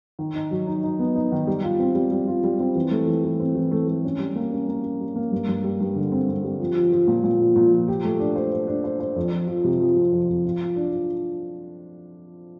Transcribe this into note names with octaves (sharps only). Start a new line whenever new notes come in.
D#3
D#4
F#3
D#4
D#4
B3
D#4
D#3
G3
F4
C4
G3
G3
F4
G3
C4
E3
A3
E3
E3
C4
E3
A3
A3
C#4
G3
A#3
C#4
A#3
C#4
G3
A#3
G2
G2
G3
G2
D3
C4
C4
G3
F3
F3
F3
A#2
A#2
F3
A#2
F3
G4
A3
D4
C5
C5
D4
C5
C5
F2
F3
F3
C3
F3
C3
F2
F2
F4
F4
D4
F4